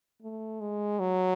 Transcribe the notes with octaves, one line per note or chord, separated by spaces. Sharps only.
A3
G#3
F#3